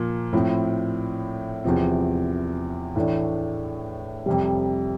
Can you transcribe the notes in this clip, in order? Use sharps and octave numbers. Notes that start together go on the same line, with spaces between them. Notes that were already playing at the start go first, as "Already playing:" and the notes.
Already playing: A#2 F3 A#3
A2 F3 C4 E4
E2 C3 F3 C4
A2 E3 A3 D4
F2 C3 G3